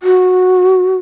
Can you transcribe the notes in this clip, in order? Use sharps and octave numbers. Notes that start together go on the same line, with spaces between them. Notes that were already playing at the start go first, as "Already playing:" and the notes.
F#4